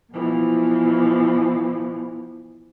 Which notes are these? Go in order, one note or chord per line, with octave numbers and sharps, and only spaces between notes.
B2 E3 F3